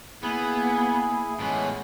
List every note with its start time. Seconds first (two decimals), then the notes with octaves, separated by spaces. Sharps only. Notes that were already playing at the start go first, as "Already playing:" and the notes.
0.23 A#3 B3 E4 G#4 G#5
1.40 A2 E3 G#3 B3 C#4